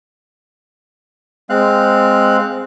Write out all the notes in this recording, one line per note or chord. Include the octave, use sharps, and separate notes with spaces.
G#3 C4 F5 F#6